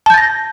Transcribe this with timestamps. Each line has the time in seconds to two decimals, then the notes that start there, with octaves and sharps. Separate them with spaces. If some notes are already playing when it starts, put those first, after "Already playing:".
0.06 A5
0.10 G6
0.14 A6
0.18 A#6